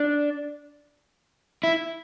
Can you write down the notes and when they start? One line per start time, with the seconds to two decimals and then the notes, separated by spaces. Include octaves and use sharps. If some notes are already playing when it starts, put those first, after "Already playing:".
Already playing: D4
1.64 E4